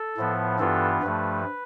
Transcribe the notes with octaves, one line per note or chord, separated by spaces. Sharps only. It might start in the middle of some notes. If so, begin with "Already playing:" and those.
Already playing: A4
A2 F3 B3
G2 E3 B3 F4 A4
G2 F3 A3 B4